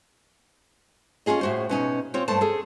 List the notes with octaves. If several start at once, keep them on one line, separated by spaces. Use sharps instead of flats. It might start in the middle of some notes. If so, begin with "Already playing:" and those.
C#4 D#4 F4 G#4 D#5
A2 F#4 C5
B2 C#4 D#4
C4 F4 C#5
G2 A3 C5 A5
G#4 A4